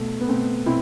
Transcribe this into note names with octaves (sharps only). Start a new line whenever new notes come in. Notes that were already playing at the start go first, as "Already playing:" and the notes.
Already playing: B2 A3
B3
B2 A3 C4
B2 C4 E4